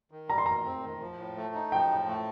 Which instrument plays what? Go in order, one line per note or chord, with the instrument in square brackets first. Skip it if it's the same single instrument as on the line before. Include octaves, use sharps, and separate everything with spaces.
[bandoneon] D#3
[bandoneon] G3 [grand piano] A#5
[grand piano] C6
[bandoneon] D#3 [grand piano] A#5
[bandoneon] C4
D#3
F3
A2
A3
D#4
[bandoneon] F3 [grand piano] G5
[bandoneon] A2
A3